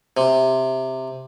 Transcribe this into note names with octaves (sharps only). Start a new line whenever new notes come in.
C3